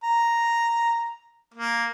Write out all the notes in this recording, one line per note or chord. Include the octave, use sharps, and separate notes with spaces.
A#5
A#3